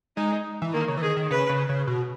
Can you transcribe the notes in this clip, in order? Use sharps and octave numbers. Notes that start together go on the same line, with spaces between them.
G#3 D#4
E3
D#3 A#3
C#3
E3
D#3 G#4
D#3
C#3 B4
C#3
C#3
B2